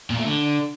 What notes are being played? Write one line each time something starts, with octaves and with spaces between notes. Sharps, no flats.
A#2
A3
D3